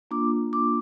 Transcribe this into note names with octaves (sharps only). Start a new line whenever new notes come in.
A#3 D4 F4 D6
D6